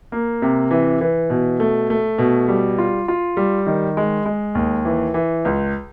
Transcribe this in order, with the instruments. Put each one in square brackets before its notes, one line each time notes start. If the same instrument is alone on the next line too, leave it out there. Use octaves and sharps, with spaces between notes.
[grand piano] A#3
C3
E3
E3
B2
A3
A3
B2
G3
F4
F4
G3
D#3
G#3
G#3
D#2
E3
E3
C#2